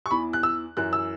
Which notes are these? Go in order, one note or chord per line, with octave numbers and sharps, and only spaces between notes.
C#6
E2 E3 B5
F#6
E6
F#2 E3 F#6
E6